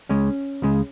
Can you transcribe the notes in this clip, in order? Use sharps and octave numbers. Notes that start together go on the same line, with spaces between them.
C#2 C#3 G#3 C#4
C#2 C#3 G#3